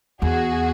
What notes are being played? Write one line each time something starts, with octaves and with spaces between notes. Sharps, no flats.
E2 F#4 G#4